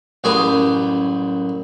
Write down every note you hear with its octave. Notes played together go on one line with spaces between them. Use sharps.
A1 F#2 G3 G#4 G#5 D6